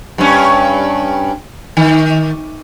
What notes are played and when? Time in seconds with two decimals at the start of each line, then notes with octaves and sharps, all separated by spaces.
0.18 G2 C#4
1.77 D#3